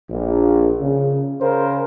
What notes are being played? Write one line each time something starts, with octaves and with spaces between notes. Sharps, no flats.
A#1
C#3
C#3 A#4 C5